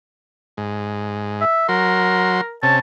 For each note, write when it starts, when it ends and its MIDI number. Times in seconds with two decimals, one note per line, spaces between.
0.57 1.45 44
1.41 1.67 76
1.68 2.41 54
1.68 2.57 70
1.68 2.41 84
2.63 2.79 48
2.63 2.79 61
2.63 2.77 81